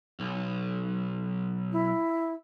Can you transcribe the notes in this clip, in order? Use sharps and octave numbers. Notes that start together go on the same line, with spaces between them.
B1
E4